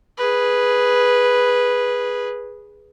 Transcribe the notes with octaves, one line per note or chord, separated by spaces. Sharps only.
G#4 B4